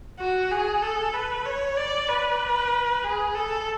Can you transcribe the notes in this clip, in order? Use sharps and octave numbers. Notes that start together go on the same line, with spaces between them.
F#4
G#4
A4
B4
C#5
D5
B4
G#4
A4